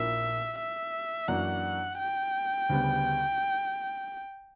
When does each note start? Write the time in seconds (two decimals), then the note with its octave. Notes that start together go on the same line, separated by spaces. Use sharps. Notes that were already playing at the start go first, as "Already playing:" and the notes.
Already playing: A#1 A#2 A#3 E4 A#4 E5
0.58 E5
1.28 F#2 E3 A#3 D4 F#4 F#5
1.99 G5
2.69 D2 C#3 G3 B3